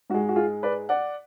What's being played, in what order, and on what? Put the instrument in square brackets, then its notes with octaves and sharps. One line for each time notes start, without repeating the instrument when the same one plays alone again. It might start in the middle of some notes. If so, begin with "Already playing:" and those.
[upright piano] G#2 F#4
G#3
F#4
F4 G#4
B4 D5
D5 F#5